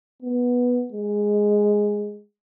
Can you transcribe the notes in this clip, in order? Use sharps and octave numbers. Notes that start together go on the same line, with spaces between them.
B3
G#3